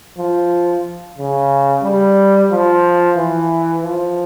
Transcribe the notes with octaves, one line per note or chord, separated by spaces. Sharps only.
F3
C#3
G3
F3
E3
F3